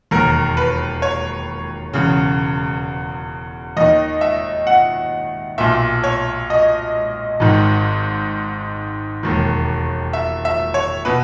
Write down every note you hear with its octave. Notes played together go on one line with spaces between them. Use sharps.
E1 D#2 D#3 A#4
B4
C#5
E1 E2 C#3
D#2 D#3 D#5
E5
F#5
B1 A#2 E5
C#5
D#5
G#1 G#2 D#3
E1 D#2 D#3
E5
E5
C#5
B2 B4